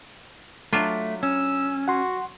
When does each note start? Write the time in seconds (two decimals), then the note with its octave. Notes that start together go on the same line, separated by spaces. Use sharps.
0.73 F#3 A3 D4 F4
1.23 C#4 E6
1.88 F#4 F#5 C6